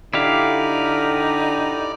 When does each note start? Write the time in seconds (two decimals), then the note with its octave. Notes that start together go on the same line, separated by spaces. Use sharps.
0.14 D3 D#4 E4 G4 D5 F5